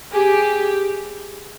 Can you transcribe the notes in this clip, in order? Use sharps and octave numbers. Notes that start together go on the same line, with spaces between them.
G4 G#4